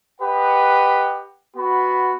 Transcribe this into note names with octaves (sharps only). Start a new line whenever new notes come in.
G4 B4 D#5 F#5
B3 F#4 B5